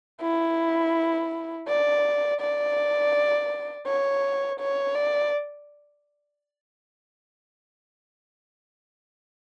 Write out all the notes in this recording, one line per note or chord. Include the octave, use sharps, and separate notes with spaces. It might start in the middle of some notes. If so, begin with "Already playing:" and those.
E4
D5
D5
C#5
C#5
D5